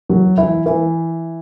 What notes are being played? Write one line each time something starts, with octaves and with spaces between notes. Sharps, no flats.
F#3 F#4
E3 E4
E3 E4